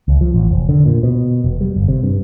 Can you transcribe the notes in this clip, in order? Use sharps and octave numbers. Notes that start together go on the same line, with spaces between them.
C#2
F3
A1
F1
D3
A#2
B2
F1
G3
G1
C3
G2